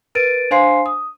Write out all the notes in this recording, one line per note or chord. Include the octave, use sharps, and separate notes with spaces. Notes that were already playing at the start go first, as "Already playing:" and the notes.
A#4 B4 A6 D7 D#7
D4 C5 F5 G#5 C6 C7
D#6